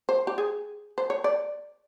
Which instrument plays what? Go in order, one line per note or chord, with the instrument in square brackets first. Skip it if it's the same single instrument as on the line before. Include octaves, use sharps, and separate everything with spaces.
[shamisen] C5
G4
G#4
C5
C#5
D5